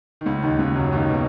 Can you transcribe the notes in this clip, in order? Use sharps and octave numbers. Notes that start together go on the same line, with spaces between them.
D#3
C#2 C#3
D#2 D#3
C#2 C#3
F#2 F#3
D#2 D#3
B2